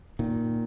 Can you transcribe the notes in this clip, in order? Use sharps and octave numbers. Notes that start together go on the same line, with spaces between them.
A#2 D#3